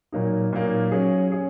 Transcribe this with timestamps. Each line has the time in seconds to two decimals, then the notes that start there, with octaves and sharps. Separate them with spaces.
0.12 A#2 F#3 A#3 D#4
0.53 A#2 F#3 A#3 D#4
0.91 F#3 C#4 G#4
1.32 C#4 G#4